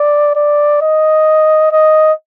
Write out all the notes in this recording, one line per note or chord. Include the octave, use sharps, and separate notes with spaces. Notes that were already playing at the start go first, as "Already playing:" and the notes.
Already playing: D5
D5
D#5
D#5